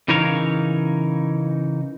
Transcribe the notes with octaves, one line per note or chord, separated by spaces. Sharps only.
C#3 E3 D#4 A#4 C#5 F5